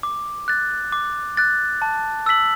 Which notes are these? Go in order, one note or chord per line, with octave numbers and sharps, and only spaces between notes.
D6
F#6 A6
D6
F#6 A6
A5
E6 B6 F#7